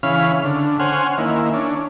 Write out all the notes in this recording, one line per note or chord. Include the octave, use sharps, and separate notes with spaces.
C#3 E3 C#4 F5 B5 F6
D3
C#4 C5 F#5 G#5 F6
D#3 A#3 E4
C#4 D4